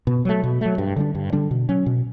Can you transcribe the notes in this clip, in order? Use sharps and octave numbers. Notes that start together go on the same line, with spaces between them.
B2
F#3 A3
B2
F#3 A3
G2
D3 G3 D4
G2
D3 G3 D4
B2
F#3 C#4
B2